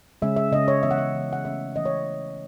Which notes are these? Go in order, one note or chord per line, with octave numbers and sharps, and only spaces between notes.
C#3 G#3 C#4 E5
E5
C#3 G#3 C#4 D#5
C#5
E3 B3 E5
F#5
E5
E3 B3
F#5
E3 A3 C#4 E5
E3 A3 C#4 D#5
C#5